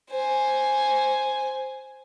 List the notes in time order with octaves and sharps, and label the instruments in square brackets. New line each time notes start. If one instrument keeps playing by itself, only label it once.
[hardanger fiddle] C5 G#5